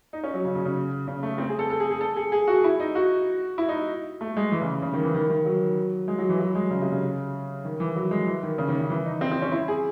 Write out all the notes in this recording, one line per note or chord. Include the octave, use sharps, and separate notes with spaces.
D#4
C#4
F#3
C#3
C#3
C#3
C#3
A3
C4
G#4
A4
A4
G#4
G#4
A4
G#4
G#4
F#4
E4
D#4
F#4
E4
D#4
A3
G#3
E3
C#3
C#3
D#3
E3
D#3
D#3
F#3
G#3
F#3
E3
F#3
G#3
C#3
C3
C#3
D#3
E3
F#3
G#3
E3
D#3
C#3
D#3
C#3
E3
D#4
C4
C4
C#4
E4
G#4